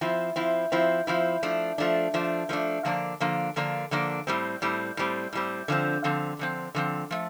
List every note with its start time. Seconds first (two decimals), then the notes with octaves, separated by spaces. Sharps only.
0.01 F3 C4 E4
0.36 F3 C4 E4
0.72 F3 C4 E4
1.07 F3 C4 E4
1.43 F3 A3 D4
1.78 F3 A3 D4
2.14 F3 A3 D4
2.49 F3 A3 D4
2.85 D3 F3 A#3 D4
3.20 D3 F3 A#3 D4
3.56 D3 F3 A#3 D4
3.91 D3 F3 A#3 D4
4.27 A2 G3 C4
4.62 A2 G3 C4
4.97 A2 G3 C4
5.33 A2 G3 C4
5.68 D3 F3 C4
6.04 D3 F3 C4
6.39 D3 F3 C4
6.75 D3 F3 C4
7.11 F3 A3